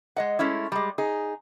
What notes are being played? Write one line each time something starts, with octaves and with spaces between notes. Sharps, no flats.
G#3 D#5 F#5
G#3 A3 C#4 E4
G3 G#3
D#4 G#4